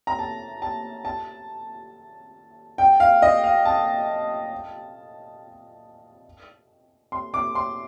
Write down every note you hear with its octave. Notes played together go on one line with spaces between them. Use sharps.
A#5
A5
A5
A5
G5
F5
D#5
F5
A5
C6
D6
C6